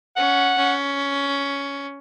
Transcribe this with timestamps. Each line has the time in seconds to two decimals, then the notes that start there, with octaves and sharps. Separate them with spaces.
0.17 C#4 F#5
0.57 C#4